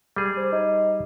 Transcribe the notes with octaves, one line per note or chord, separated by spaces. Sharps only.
G3 G#4
C5
D#4